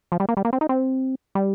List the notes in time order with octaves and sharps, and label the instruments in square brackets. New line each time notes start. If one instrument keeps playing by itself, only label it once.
[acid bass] F3
G3
A#3
G3
A#3
C4
D#4
C4
G3